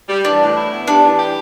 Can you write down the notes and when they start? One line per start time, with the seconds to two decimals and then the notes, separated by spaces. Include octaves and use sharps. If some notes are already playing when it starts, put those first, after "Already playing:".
0.09 G3
0.25 E3 D4
0.41 A2
0.57 E4
0.72 B3
0.87 G3 D4
1.04 E3
1.19 G4